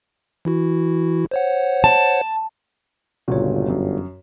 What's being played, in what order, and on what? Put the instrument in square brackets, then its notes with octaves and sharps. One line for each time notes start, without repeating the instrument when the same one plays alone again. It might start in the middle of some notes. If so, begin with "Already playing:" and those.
[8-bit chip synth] E3 E4 F#4
C5 C#5 F#5
[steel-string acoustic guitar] A5
[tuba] G1 [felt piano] C#2 A#2 [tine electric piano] F#4 C#5
[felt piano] F#2